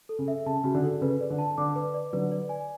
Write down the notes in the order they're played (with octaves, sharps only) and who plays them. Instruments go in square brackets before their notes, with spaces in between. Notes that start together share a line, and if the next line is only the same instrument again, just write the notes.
[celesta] A4
[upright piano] C#3
[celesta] E5
[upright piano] C#3 [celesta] A5
[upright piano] C#3 [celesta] F#4
[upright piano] D3
[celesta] A4
[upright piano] C#3 [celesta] B4
[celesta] D5
[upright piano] D3
[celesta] A5
[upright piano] D3 [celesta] D6
[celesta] B4
D5
[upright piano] D3 F#3 [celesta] B4
[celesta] D5
G#5